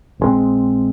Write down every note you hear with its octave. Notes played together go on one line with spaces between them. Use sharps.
A#1 G#2 G#3 C4